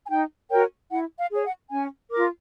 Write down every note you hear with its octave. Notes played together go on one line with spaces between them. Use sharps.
G#5
D#4 G5
F#4 A#4 C#5 G5
E4 F#5
F5
G#4 C#5
F#5
C#4 G#5
F4 A#4 D6